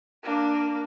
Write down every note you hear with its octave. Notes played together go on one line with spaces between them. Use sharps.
A#3 D4